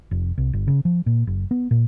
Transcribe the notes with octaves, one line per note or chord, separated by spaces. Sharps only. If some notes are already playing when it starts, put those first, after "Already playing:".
F1
C2
G1
C#3
F3
A#2
F#1
B3
A#2